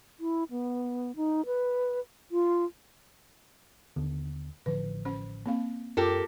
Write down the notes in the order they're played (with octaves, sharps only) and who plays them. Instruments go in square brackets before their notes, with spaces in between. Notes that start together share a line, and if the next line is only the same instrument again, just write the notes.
[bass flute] E4
B3
D#4
B4
F4
[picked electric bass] D#2 D3 B3
[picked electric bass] A1 D3 F3 [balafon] B4
[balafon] C#4 C5
A#3 C4 F5
[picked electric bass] F#2 [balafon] F4 [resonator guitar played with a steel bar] G4 A4 A#4